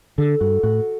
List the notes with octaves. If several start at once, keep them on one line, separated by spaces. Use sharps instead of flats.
D3 A4
G2 F#4
A2 F#4